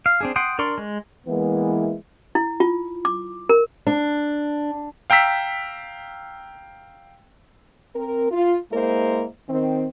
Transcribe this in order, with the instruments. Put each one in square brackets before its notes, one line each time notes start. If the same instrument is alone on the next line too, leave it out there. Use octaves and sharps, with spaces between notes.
[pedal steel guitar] F5
C4 D4 G#4
F#5 G5 C6 D#6
D4 A#4 D5 C6 C#6
G#3
[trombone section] E3 G#3 A#3 B3 E4
[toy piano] E4
F4
D6
A#4
[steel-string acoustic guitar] D4
[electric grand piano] F5 G5 A#5 E6 B6
[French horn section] C4 A#4
F4
G#3 A#3 E4 A#4 C5
D#3 C4